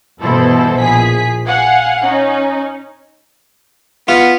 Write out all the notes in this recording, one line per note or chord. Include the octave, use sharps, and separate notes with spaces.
G2 B2 E3 E4 A4 C5
A#1 F3 G#4 B6
F5 F#5 G#5
C#4 D#4
B3 F4